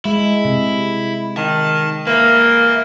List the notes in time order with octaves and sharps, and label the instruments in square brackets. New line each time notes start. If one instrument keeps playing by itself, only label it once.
[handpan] G#3 [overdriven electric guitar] E4
[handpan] C3
[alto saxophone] D#3 [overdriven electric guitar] A5
[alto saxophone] A#3 [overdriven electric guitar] B4 E5